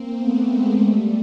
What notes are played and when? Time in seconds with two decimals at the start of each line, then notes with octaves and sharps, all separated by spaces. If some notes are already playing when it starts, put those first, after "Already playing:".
Already playing: A#3 C4
0.16 A3 B3
0.48 G#3 A#3
0.79 G3 A3